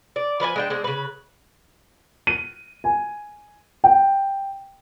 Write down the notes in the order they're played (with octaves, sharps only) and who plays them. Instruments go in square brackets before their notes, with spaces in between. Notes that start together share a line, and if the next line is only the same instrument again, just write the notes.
[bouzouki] D5
F3 B4 D5 G#5
G#3 D4 G5
G#3 C4 D4
C#3 B4
[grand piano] D#7
G#5
G5